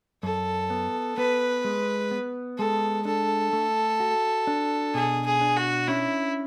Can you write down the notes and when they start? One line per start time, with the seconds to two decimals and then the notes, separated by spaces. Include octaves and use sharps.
0.23 F#2 A4
0.70 B3
1.17 B3 B4
1.65 G#3
2.11 B3
2.58 G#3 A4
3.05 D4 A4
3.53 A3
4.00 F#4
4.47 D4
4.94 B2 G#4
5.26 G#4
5.41 D4
5.57 F#4
5.88 C#4 E4